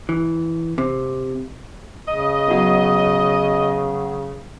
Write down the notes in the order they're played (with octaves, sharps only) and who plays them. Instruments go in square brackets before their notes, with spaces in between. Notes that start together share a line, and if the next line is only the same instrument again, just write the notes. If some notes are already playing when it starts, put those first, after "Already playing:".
[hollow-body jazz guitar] E3
C3
[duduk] C#3 [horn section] D#5
[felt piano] F#3 B3